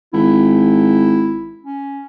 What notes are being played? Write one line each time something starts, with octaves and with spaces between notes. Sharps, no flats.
G#1 E4
C#4